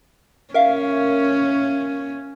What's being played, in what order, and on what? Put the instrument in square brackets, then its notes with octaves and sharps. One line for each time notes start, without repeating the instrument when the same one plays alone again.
[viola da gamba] C#4 [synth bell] A#4 E5 F5